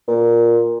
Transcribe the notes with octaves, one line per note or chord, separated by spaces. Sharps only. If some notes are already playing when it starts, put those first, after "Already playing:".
A#2